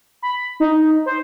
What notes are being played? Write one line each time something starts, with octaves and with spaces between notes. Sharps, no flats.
B5
D#4
C5